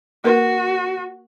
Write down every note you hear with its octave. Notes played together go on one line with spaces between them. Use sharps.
A#3 F#4 A#4 B4